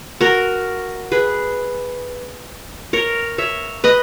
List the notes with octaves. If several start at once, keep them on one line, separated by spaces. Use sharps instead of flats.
F#4 A#4
G#4 B4
A#4 C#5
C#5 E5
B4 D#5